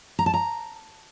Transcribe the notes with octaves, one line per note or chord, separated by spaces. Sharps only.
A#5
A5
A#5